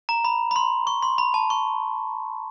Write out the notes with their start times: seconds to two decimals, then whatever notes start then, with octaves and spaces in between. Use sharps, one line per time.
0.09 A#5
0.25 B5
0.51 B5
0.56 C6
0.87 C#6
1.03 C6
1.18 B5
1.34 A5
1.50 C#6